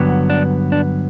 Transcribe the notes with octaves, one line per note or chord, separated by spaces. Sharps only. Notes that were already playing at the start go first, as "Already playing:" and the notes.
Already playing: G2 D3 F#3 B3
D4
D4